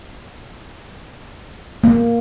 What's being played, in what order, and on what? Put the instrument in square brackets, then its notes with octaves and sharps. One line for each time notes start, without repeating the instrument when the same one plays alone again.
[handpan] A#3